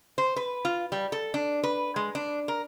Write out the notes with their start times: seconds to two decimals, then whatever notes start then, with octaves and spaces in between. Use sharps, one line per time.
0.18 C5
0.36 B4
0.65 F4
0.92 G3
1.12 A4
1.34 D4
1.63 B4
1.96 G#3
2.15 D4
2.48 A#4